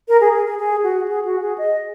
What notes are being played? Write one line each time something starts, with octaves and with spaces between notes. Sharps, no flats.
A#4
G#4
G#4
G#4
G#4
F#4
G#4
F#4
G#4
D#5